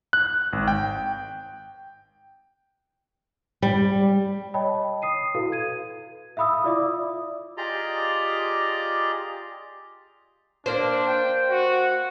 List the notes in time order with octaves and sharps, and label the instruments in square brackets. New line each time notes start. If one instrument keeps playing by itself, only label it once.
[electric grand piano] F#6
G#1
G5
[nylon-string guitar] G3
[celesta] C#5 D#5 G5 A5 B5
D#6 C7 D#7
E4 F#4 A4 B4 F5
G#6 D#7
E5 F5 B5 D#6 E6
E4 F4 D5 E5 D6 D#6
[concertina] F4 G4 G#4 D5 D#5 A#5
[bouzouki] A#3 C5 [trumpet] D4
[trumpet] G5
F#4